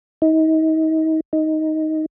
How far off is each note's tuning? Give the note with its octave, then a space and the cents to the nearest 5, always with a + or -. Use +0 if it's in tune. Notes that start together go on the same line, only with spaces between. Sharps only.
D#4 +35
D#4 +10